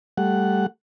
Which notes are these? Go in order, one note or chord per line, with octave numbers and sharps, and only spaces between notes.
G3 A3 F#5